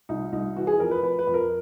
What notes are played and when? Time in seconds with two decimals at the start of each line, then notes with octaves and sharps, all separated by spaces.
0.09 C2 D#4
0.32 C2 D#4
0.56 E3 F#4
0.67 G#4
0.79 F2 A#4
0.91 B4
1.03 F2 B4
1.19 B4
1.27 F2
1.34 A#4